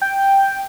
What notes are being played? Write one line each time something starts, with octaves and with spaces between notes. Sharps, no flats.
G5